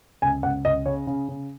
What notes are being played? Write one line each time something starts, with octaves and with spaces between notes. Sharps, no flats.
C#2 G#5
C#2 F#5
C#2 D#5
C#3 C#5
C#3
C#3